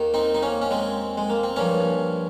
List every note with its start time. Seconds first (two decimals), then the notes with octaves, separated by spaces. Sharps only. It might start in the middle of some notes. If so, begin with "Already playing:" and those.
Already playing: D#2 D#3
0.14 C4 D#4
0.35 D#4
0.43 A#3 C#4
0.62 C#4
0.71 G#3 C4
1.18 G#3
1.30 A#3
1.43 C4
1.56 G2 F3 A#3 C#4